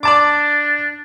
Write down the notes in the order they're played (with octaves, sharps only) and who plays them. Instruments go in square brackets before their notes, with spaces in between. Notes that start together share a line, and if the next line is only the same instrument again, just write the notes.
[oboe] D4 [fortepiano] D5 A5 D6